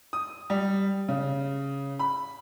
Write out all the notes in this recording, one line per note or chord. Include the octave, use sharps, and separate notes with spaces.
D#6
G3
C#3
B5